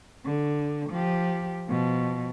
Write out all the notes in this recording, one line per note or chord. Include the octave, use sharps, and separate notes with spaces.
D3
F3 G4
B2 F3